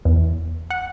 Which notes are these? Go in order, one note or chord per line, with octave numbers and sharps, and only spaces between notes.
E2
F#5